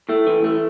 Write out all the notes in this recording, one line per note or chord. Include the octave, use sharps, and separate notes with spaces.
A2 A3
E3
A3